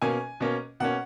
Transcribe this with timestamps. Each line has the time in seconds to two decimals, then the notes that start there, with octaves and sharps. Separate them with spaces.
0.02 B2 A#3 C#4 G#5
0.40 B2 A#3 C#4
0.80 B2 A#3 C#4 F#5